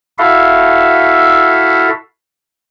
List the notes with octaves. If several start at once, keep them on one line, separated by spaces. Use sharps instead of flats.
E4 F#4 A4 E5 F5